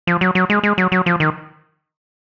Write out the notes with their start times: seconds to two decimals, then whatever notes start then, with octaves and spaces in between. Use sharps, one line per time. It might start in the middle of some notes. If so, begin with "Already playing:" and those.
0.07 F3
0.21 F#3
0.35 F#3
0.50 G#3
0.63 G#3
0.78 F#3
0.92 F#3
1.06 F3
1.20 D#3